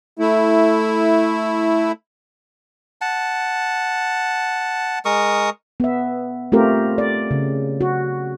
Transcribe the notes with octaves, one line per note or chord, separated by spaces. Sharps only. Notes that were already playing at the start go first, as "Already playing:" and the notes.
A3 E4
F#5 A5
G#3 A#4 C#6 D#6
B3 E5
A3 C4 F4 G4 A#4
D5
C#3
F#4